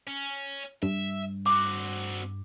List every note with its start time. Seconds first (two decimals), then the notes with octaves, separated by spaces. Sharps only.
0.07 C#4
0.83 G2 E5
1.46 C4 F#4 D6